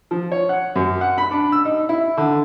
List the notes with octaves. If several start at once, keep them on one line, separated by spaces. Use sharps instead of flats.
F3
C#5
F#5
F#2
F#5
B5
D4
E6
D#4
E4
D3